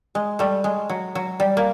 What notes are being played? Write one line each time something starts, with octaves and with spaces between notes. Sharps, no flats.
G#3
G3 A3
G#3
F#3
F#3
G3
A#3